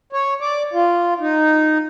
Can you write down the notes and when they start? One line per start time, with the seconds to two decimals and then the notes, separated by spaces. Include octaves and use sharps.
0.13 C#5
0.41 D5
0.73 F4
1.20 D#4